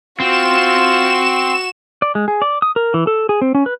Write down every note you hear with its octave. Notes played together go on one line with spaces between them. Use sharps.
C4 F4 F#4 E7
D5
G#3
G#4
D5
D#6
A#4
E3
A4
G#4
C4
C#4
B4